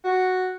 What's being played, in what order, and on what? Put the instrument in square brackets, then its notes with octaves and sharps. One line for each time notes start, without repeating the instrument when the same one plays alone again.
[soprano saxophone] F#4